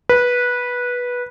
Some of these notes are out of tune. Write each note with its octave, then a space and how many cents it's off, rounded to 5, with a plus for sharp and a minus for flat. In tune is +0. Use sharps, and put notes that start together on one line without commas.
B4 -15